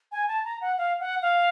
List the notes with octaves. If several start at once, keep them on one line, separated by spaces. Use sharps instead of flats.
G#5
A5
A#5
F#5
F5
F#5
F5